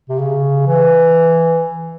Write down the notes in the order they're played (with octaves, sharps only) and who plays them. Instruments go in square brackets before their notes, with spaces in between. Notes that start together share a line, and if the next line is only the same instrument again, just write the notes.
[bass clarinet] C3
C#3
E3